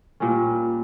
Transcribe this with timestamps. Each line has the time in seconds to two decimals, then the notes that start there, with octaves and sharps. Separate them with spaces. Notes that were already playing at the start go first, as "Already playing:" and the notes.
0.20 A#2 G3 A#3 C#4